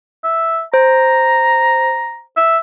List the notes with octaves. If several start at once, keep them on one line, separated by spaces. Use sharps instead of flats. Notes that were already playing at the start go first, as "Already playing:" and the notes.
E5
C5 A#5
E5